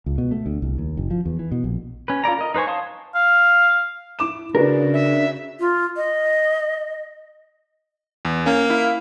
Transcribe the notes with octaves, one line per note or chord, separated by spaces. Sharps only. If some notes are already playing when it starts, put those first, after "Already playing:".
C#2
B2
A3
D2
C2
D#2
F#1
F3
E2
E3
B2
A#1
C#4 B4
F4 A4 D5 A#5
A#4 D#5
D#4 B4 C5 G#5 C#6
C#5 F5 A5 C6 D#6
F5
E4 D6 E7
C#3 D4 F#4 G#4 A#4 B4
E5
F4
D#5
E2
A#3 C#4
E4 F5